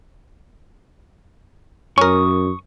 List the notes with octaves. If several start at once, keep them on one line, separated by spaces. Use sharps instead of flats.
F#2 C#4 A#4 C#6 D#6